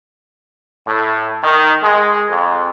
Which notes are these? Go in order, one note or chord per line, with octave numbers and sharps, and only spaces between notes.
A2
D#3
G#3
F2